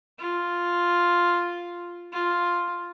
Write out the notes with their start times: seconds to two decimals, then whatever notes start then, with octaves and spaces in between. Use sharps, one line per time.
0.19 F4
2.12 F4